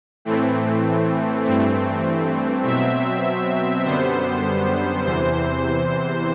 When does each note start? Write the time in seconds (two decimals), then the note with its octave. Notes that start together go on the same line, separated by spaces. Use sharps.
0.25 A2 E3 A3 C4
1.45 G2 E3 A3 C4
2.64 B2 F#3 C4 E5
3.84 F#2 D3 G3 B3 C5
5.04 E2 C3 E3 C5